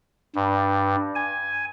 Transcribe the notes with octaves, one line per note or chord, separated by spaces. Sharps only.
G2
G#5